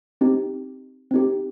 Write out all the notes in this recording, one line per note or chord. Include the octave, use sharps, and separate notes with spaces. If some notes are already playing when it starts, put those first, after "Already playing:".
C4 D#4 G4
C4 D#4 G4